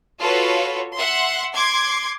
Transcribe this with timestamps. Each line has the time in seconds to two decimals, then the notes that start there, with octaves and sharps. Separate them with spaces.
0.20 F4 F#4 A4 B4 C#5
0.95 E5 F#5 C6
1.54 C6 D6 G#6